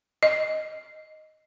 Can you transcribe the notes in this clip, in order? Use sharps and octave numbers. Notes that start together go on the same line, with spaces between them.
D#5